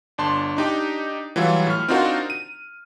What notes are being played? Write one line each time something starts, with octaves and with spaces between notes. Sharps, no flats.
G1 D4 A5 C6
D4 D#4 G4
E3 F#3 G3 E4 F4
A2 F6
C4 D4 D#4 F4 F#4 A#4
D#7